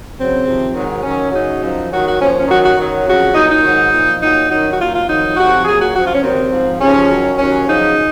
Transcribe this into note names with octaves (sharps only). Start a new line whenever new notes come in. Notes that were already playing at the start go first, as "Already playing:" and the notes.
F#2 C#3 F#3 C4
F2 C3 D#3
G#2 D#3 F#3
F#2 D#3 F#3 C#4
F#2 C#3 F#3 D#4
F#2 F3
D#2 D#3 F#3 F#4
F#4
A#2 F3 C#4
C#4
F#2 D#3 F#3 F#4
F#4
F#2 D#3 F#3
F2 C#3 F#3 F#4
A#2 F#3 D#4
D#4
G#2 D#3 F#3
A#2 F3
A#2 F#3 D#4
F#2 D#3 F#3 D#4
F#4
A#2 F#3 F4
F4
F2 D#3 F#3 D#4
F2 C3 F#3 F#4
A#2 F#3 G#4
F#4
F#2 F3 F#4
F4
C#4
D#2 D#3 F#3 C4
G#2 F3
D#2 C#3 F3 C#4
F#2 D#3 F#3
D#2 D#3 F#3 C#4
F#2 C#3 F3 D#4